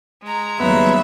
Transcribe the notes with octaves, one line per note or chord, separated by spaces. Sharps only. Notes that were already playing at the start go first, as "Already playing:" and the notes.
G#3 A#5
D#2 C#3 F#3 G3 B3 E5